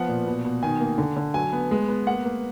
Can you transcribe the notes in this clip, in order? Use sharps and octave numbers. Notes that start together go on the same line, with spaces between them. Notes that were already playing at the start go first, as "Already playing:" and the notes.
Already playing: F3 B3 F#5
A#2
B2
B2
D#3 G#5
A#3
D3
D3
F#3 G#5
B3
G#3
B3
A#3 F#5
A#3